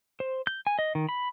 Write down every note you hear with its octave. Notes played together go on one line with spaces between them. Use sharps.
C5
G6
G#5
D#5
D#3
B5